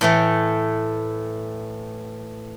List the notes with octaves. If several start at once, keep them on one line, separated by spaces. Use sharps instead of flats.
A2 E3 A3